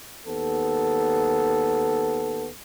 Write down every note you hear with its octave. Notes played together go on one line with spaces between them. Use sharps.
D#2 B3 A4